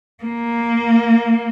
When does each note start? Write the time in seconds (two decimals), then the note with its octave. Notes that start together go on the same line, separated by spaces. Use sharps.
0.25 A#3